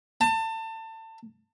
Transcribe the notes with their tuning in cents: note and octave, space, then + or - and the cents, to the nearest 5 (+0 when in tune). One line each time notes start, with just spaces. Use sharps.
A5 +30